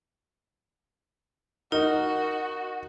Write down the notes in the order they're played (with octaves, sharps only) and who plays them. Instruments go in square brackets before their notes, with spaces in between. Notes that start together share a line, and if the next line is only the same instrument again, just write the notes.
[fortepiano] D#4 [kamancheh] F#4 [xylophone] A#4